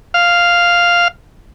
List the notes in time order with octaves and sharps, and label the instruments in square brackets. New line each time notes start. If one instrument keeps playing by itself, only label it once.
[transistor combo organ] F5